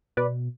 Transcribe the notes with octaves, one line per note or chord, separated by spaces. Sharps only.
B2 B4 D5